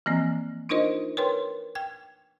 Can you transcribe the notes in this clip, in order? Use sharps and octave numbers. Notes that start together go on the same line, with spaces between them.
E3 F3 A#3 C4
D4 D#4 F4 A#4 C5 D#5
A#4 B4 C#5 G5 C6
G5 G#6